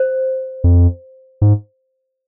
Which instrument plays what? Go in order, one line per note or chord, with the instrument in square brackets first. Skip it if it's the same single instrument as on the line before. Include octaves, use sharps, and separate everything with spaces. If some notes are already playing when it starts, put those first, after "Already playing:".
Already playing: [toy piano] C5
[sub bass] F2
G#2